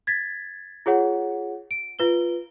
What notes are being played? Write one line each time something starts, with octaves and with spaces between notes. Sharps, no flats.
G#6 A6 B6
F4 G#4 C#5 F#5
D7
F4 B4 G7